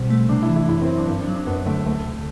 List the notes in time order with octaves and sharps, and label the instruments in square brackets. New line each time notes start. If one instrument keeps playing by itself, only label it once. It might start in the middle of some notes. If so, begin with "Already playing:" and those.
Already playing: [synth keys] B2 G3 [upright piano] C4
[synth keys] A3
[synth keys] C3 [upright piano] D4
[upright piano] E4
[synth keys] E3
[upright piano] E4
[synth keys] F#2 [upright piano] E4
[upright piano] C4
[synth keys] F#3
[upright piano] D4
[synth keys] G2 [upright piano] C4
[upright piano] D4
[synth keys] F#3
[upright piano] D4
[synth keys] F#2 [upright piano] B3
[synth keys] D3 [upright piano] A3
[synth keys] D2 [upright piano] A3
[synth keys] C3